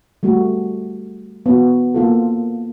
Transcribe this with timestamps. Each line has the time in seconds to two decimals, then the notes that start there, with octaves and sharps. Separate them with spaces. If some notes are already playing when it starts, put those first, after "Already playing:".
0.23 G3 A3 F#4
1.46 B3 F#4
1.94 A#3 F4 A4